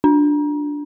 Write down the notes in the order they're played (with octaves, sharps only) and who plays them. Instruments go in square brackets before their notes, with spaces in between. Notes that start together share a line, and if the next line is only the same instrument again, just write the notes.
[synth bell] D4